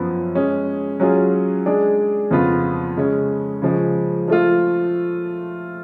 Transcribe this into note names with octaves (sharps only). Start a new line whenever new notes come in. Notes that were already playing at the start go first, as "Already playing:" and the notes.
Already playing: F#2 F3 B3
G#3 C#4 G#4
F#3 C#4 F4 G#4
G#3 D4 G#4 D5
F2 C#3 F3 B3 F4
C#3 G#3 C#4
C#3 F3 G#3
F3 A3 F4